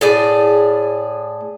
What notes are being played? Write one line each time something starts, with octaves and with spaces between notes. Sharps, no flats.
A2 G#4 D5